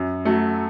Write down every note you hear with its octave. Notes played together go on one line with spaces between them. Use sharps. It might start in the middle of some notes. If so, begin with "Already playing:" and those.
Already playing: F#2
F#3 A3